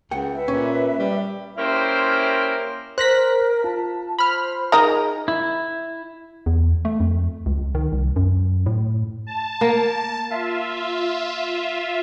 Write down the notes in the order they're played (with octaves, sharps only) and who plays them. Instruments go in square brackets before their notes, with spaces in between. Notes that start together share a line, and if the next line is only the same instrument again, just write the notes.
[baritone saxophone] C#2 [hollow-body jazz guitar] F#5 G5
[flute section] B4 E5
[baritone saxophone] A#2 [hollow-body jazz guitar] C#4
[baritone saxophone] G3
[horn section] A#3 C#4 E4 G4 A#4 C5
[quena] A#4 [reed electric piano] C5 [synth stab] F#6 A#6 B6
[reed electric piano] F4 [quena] A5
[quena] C5 [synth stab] B5 F6
[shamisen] D#4 A#4 D#5 [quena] G#4 [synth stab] A#5
[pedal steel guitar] E4
[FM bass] E2
A3
F2
C#2
D#3
C2
F#2
A2
[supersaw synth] A5
[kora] A#3
[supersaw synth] F4 E5